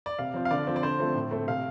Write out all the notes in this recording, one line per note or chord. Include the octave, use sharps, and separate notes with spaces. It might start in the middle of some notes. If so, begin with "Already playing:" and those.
D5
C3 F5
F3 C4
F5
D3 D5
F3 C4
D5
D3 C5
F3 A3 C4
A2
A3 C4
C3 F5